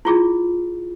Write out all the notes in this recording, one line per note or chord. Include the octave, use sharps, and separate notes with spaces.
E4 F4 G#4